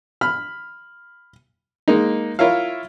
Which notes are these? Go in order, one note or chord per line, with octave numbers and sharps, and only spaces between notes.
B5 F6
G#3 A#3 D#4
E4 F4 A#4 C#5 E5 F5